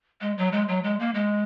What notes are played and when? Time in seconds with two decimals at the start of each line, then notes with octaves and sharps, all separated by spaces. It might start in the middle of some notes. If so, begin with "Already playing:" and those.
0.21 G#3
0.38 F#3
0.52 G#3
0.68 F#3
0.84 G#3
1.00 A#3
1.14 G#3